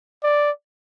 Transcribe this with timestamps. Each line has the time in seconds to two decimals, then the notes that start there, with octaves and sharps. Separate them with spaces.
0.24 D5